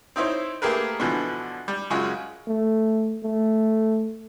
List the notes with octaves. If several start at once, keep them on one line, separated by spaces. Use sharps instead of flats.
C4 D#4 E4 C5 C#5
A3 A#3 G4 G#4 A#4 B4
B2 D3 E3 F3
G3
F#2 C#3 G#3 F4 F#4
A3
A3